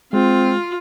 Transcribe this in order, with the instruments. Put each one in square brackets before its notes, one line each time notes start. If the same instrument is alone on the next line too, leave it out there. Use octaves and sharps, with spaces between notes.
[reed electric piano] G#3 [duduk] C4 [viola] F4